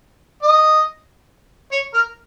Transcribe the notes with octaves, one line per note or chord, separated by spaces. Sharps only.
D#5
C#5
A#4